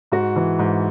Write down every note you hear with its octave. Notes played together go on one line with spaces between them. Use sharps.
G#2 F#4
E3
G#2